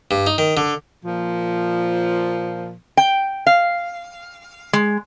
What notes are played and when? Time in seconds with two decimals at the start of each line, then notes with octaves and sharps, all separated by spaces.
0.11 G2
0.27 D#4
0.38 D#3
0.57 D3
1.03 A#2 F3
2.97 G5
3.47 F5
4.73 G#3